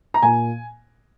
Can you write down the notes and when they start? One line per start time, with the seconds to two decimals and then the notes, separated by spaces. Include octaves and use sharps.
0.14 A#5
0.23 A#2 G#5